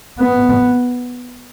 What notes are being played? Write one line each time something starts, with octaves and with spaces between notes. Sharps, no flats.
B3